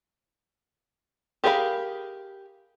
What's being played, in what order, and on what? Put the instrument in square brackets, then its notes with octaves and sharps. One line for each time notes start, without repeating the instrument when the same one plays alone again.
[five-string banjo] G4 G#4 A#4 F5 B5